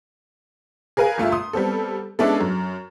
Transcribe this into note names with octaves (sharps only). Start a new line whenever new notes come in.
G#4 A#4 B4 F5 G#5
G1 A3 F4 E5
C6 D#6
G3 B3 C4 A4
G#3 B3 C#4 D4 E4 A4
F#2